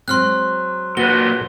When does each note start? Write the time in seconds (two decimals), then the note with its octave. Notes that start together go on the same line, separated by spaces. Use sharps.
0.08 F#3 G#3 C4 C6 F6 F#6
0.97 A#2 F#3 F#4 B4 G7